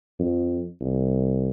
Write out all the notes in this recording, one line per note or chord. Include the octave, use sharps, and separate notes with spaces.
F2
C2